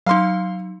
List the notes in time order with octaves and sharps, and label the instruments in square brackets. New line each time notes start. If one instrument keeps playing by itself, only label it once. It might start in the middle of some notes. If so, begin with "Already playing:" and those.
[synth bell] F#3 D#4 [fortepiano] F5 C6